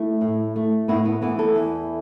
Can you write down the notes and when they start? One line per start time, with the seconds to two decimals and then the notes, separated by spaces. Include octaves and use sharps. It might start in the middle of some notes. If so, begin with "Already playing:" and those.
Already playing: A3 E4
0.21 A2
0.56 A3
0.88 A2 B3 E4
1.05 B3
1.22 E3 B3
1.38 E4 A4
1.55 E2